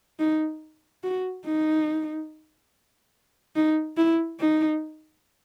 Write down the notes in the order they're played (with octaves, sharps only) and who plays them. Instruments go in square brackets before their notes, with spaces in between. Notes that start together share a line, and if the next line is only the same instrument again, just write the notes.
[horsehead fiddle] D#4
F#4
D#4
D#4
E4
D#4